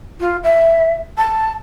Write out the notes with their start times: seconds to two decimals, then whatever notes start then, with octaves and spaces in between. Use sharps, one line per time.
0.20 F4
0.43 E5
1.18 A5